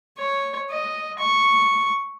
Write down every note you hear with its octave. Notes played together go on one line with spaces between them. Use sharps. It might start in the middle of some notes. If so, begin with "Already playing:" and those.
C#5
D#5
C#6